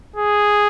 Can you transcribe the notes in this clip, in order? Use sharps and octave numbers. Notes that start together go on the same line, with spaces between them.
G#4